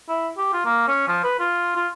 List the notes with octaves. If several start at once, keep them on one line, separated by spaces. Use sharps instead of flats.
E4
G4
F4
A#3
C#4
F3
B4
F4
F4